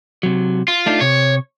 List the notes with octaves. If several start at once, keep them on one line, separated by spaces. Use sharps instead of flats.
C3 F#3
F4
A3 D4 D#4
C3 C#5